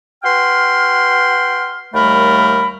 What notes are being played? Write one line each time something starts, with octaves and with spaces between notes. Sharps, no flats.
F#4 B4 G5 C6 F6
D#2 G3 A3 A#4 B5